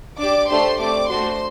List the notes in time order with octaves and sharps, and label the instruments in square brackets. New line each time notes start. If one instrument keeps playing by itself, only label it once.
[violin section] D4 G4 D5 D6
A3 D4 G4 C5 C6
A3 C4 G4 D5 D6
A3 D4 F#4 C5 C6